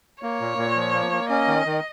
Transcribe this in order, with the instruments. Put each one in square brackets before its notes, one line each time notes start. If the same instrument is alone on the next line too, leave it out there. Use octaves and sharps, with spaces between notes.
[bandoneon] A#3 [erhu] C#5
[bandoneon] A#2
A#2
F3
A#3
A#3
[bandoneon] C#4 [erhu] D#5
[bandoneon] D#3
D#3